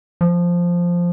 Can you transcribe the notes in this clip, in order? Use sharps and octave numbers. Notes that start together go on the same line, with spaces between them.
F3